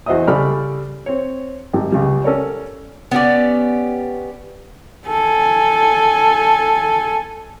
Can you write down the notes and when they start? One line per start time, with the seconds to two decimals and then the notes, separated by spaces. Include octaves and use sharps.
0.06 E2 F#4 C5 D#5 E5 D#6
0.27 C#3 G3 A4 D5 B5 F6
1.06 C4 C#5
1.73 G#1 G3
1.92 C#2 C#3 G3
2.24 C#4 A4 A#4 C#5 D5
3.11 B3 C#4 G4 D5
5.07 A4 G#5